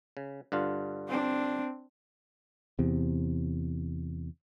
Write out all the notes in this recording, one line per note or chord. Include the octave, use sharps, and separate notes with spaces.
C#3
G2 D3 F4
C4 D4
E2 C3